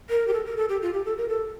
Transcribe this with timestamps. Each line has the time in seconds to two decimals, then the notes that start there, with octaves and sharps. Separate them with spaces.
0.10 A#4
0.27 G4
0.33 A4
0.46 A#4
0.57 A4
0.69 G4
0.82 F4
0.93 G4
1.05 A4
1.18 A#4
1.29 A4